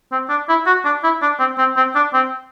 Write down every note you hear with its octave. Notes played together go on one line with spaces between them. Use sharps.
C4
D4
E4
F#4
D4
E4
D4
C4
C4
C4
D4
C4